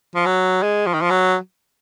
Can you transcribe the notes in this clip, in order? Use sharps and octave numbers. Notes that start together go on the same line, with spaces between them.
F3
F#3
G#3
F3
D#3
F3
F#3